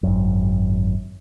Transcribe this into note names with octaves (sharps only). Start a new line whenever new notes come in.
G#1 F#2